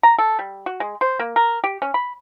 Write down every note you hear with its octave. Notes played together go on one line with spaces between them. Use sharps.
A#5
A4
G3
F#4
G#3
C5
A#3
A#4
G4
C#4
B5